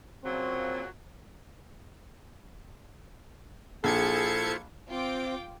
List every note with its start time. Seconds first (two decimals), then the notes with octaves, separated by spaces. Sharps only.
0.24 A#2 C#3 F#3 C4
3.84 A#1 E4 F4 G#4 A4 C5 G#6 C#7
4.89 C4 F4 G5 D6